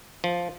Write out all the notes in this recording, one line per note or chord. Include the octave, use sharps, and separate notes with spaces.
F3